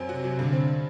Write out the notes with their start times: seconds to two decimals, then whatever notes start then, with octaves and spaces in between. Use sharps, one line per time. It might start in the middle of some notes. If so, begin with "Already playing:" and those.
Already playing: F#2 F#3 C4
0.09 C3 F#4
0.24 F#3
0.37 G2 D3
0.53 C4